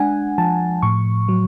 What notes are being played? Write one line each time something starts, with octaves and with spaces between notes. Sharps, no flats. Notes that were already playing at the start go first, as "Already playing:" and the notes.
Already playing: G#3 D4 F#5 G#5
F3 A5
A2 C#6
F#3